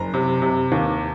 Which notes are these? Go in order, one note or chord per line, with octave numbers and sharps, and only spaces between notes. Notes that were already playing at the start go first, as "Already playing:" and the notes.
Already playing: F#1 A#5
C3
C3
D#2